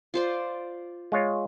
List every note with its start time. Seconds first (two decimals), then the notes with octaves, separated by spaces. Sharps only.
0.14 F4 C5 D5
1.12 G#3 F4 C#5